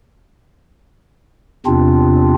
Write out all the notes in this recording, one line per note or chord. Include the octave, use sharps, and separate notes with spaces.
E2 C3 C4 D4 F4